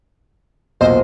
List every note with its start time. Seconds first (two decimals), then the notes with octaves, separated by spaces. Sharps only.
0.81 B1 E2 A#2 C5 D#5